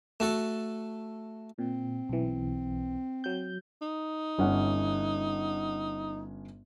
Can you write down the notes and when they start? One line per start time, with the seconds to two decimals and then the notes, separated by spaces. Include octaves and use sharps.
0.20 A3 F#4 A4
1.59 A#2 C4
2.09 B1 E3
3.24 F#3 G6
3.82 D#4
4.38 G1 C#4 F#5